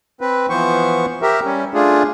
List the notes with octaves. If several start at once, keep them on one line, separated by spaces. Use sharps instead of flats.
C4 B4
E3 F3 B3 C5 C#6
G4 A#4 E5
G3 C#4
A3 D4 F4 G#4